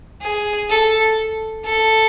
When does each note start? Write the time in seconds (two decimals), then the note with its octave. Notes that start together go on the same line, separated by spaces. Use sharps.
0.21 G#4
0.69 A4
1.65 A4